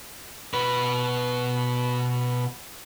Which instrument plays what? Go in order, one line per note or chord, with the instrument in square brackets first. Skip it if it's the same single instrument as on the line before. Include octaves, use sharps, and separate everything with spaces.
[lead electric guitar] B2 B4